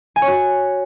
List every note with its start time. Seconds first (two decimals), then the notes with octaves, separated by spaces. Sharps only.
0.16 G#5
0.22 C#5
0.28 F#4